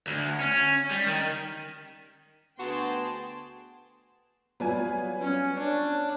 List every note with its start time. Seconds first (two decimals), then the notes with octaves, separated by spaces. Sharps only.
0.07 D2
0.40 C#4
0.91 G3
1.07 D#3
2.59 D2 B3 F#4 G#4 G5 A5 C6
4.60 F#3 G3 B3 F4 G#5
5.21 C#4
5.58 D4 C#5